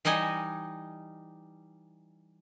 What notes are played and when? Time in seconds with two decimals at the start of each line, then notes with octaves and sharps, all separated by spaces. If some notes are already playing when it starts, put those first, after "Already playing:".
0.05 E3 G3 D#4 D#5 G#5